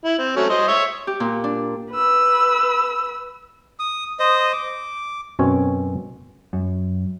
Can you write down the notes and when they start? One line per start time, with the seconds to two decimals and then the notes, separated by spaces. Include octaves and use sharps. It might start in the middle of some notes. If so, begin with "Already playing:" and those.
0.05 E4
0.19 C4
0.36 F#3 A3 C#4
0.50 C5 D#5 C6
0.68 C#5 E5
1.07 G4
1.20 A#2
1.44 D4
1.91 B4 E6
3.79 D#6
4.19 C5 D#5 D#6
4.53 D6
5.39 F#2 B2 C4 C#4 C#5
6.53 F#2